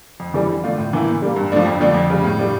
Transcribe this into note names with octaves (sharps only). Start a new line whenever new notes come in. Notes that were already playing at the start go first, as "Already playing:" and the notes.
F2
E3 G3 D4
D3
A3 D4 F4
A2
E3 A#3 E4
A#2
G3 A#3
G2
F3 A3 D4
F2
D3 F3 A3 D4
F2
C#3 G3
A2
G3 D4